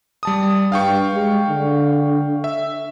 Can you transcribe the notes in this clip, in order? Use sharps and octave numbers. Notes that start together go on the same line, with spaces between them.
G3 A5 D#6
G2 F5 G5 C#6
G#3
D3
E5